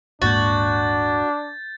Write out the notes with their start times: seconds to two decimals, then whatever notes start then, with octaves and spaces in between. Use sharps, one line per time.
0.22 D#1 G#2 A#3 D4 F#4 G6 A6